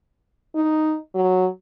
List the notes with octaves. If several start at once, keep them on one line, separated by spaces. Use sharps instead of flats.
D#4
F#3